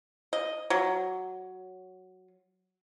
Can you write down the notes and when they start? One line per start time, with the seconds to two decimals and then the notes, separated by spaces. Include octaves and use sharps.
0.33 D#5
0.70 F#3